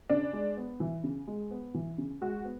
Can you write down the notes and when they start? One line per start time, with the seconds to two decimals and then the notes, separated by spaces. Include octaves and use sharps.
0.10 C#3 D4
0.33 G#3
0.57 B3
0.80 E3
1.04 C#3
1.27 G#3
1.51 B3
1.74 E3
1.98 C#3
2.21 G#3 F#4
2.45 B3